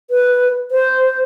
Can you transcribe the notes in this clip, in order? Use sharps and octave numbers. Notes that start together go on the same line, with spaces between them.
B4
C5